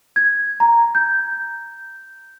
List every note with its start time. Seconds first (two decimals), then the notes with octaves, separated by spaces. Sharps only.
0.16 G#6
0.60 A#5
0.95 G6